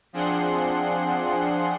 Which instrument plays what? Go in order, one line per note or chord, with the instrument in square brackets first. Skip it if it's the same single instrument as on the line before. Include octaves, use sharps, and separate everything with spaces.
[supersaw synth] F3 C4 D4 G#4 F#5 C6